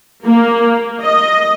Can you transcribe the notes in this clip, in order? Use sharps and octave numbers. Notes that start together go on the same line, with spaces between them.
A#3
D#5